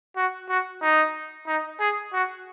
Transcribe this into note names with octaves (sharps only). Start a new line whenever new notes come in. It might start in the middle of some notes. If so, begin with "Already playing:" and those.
F#4
F#4
D#4
D#4
G#4
F#4